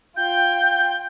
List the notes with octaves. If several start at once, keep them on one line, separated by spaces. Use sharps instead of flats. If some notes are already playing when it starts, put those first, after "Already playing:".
F4 G5 G6